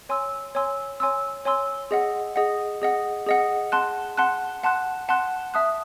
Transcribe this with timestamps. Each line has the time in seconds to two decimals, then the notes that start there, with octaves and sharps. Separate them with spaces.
0.09 C#5 G#5 C6 E6
0.55 C#5 G#5 C6 E6
1.00 C#5 G#5 C6 E6
1.45 C#5 G#5 C6 E6
1.91 G#4 D#5 F#5
2.36 G#4 D#5 F#5
2.82 G#4 D#5 F#5
3.26 G#4 D#5 F#5
3.72 F#5 A5 C6 F#6
4.17 F#5 A5 C6 F#6
4.63 F#5 A5 C6 F#6
5.09 F#5 A5 C6 F#6
5.54 E5 A5 D#6 F#6